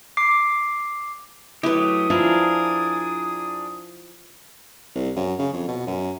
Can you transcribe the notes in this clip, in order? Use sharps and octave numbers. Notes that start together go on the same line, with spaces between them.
D6 C7
F#3 A3 E4 G4 B4 D#6
F3 D4 E4 G#4 A#4
C2
F#2
C#3
F2
B2
F#2